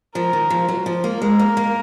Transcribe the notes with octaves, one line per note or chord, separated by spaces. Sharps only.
F3 A#4
D#3
F3
F#3
F3
A#3
G#3 A#4
A#3
A#3